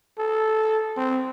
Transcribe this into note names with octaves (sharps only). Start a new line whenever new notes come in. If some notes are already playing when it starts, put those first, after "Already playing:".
A4
C4